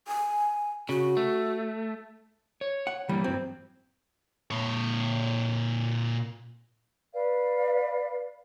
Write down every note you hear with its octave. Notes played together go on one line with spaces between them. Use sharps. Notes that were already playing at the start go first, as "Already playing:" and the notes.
G#5
C#3 F#4
A3
C#5
F#5
E3 G3 A#3
G2 F#3 C4
A#2 C#5
B4 D5 F5